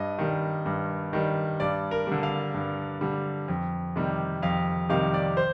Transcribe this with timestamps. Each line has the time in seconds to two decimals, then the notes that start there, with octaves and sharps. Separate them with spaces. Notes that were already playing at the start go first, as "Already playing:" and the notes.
Already playing: G2 D#5
0.19 D#3 G3
0.66 G2
1.13 D#3 G3
1.60 G2 D5
1.91 A#4
2.07 D3 G3
2.23 F5
2.54 G2
3.01 D3 G3
3.48 F2
3.96 C3 D#3 G3
4.43 F2 F5
4.89 C3 D#3 G3 F5
5.14 D5
5.37 C5